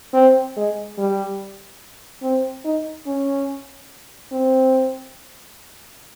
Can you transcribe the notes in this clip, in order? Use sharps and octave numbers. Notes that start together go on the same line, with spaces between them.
C4
G#3
G3
C4
D#4
C#4
C4